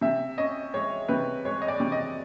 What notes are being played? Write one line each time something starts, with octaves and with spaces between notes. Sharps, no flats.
C3 E5
C#4 D#5
G#3 C#5
C3 B4
G#3 C#5
D#5
D5
C3
D#5